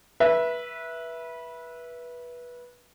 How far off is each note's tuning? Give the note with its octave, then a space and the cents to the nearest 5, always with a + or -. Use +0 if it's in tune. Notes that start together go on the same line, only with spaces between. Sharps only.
B4 -20 E5 +0